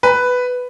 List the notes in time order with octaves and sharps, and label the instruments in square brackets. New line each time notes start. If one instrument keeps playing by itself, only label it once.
[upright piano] B4